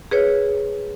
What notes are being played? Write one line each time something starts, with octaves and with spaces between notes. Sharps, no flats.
G#4 B4 C#5